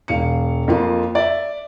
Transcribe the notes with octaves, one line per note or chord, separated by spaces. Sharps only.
E1 F5 C#7
F2 A#3 F4
D5 E5